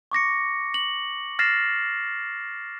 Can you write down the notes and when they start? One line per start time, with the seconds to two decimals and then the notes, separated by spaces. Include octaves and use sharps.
0.12 C#6 D6 A#6 C#7
0.74 F#7
1.39 F6 A6 A#6 C7 E7